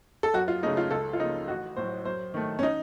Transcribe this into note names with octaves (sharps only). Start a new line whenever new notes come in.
A4
F#2 F#4
F4
C#3 A3 D#4
F4
C#2 A4
F4
C#3 F3 A#3 D#4
A1 F#4
A2 F#3 C5
F#2 C5
D#3 A3
C#4
D#4